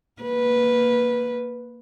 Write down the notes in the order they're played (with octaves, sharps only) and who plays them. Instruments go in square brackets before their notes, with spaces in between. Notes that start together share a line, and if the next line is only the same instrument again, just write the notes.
[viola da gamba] A#3 B4